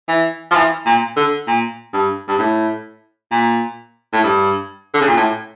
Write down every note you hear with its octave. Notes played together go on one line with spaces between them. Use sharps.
E3
F3
E3
A#2
D3
A#2
G2
G2
A2
A#2
A2
G2
D3
C#3
A#2
A2